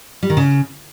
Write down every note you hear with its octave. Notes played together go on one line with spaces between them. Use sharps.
G3
D#3
C#3